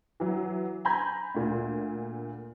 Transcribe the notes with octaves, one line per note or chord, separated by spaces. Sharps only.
E3 F#3
G#5 A#5 B5 G6 G#6
D2 A#2